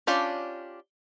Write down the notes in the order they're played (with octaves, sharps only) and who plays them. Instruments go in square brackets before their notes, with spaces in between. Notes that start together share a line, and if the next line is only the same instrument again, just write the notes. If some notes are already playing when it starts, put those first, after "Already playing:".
[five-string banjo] C#4 D4 F4 G4 D5